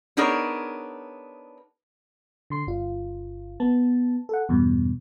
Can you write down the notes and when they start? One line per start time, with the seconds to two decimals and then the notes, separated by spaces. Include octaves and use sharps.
0.17 B3 D4 D#4 G#4 A#4 C#5
2.50 D3 C6 C7
2.67 G1 F4
3.60 B3 A5
4.29 A4 F#5
4.49 E2 G2 B2